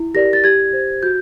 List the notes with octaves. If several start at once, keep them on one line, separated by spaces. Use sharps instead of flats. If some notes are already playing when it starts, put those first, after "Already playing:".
Already playing: E4
G4 A#4 D5 A#6
A6
G4 G#6
C5
F#4 G6